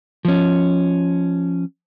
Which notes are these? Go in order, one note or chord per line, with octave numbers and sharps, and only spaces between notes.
F3 C#4